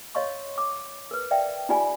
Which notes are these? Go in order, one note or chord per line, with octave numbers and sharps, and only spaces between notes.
C#5 D#5 F5 C6 C#6
D6
A#4 B4
D5 E5 F5 G5
D#4 F4 G4 D5 G#5 B5